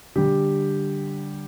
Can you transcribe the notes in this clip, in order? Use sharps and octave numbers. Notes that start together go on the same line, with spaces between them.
D3 G3 G4